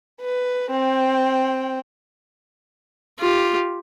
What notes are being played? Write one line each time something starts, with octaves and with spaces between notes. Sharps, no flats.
B4
C4 G5
F4 G4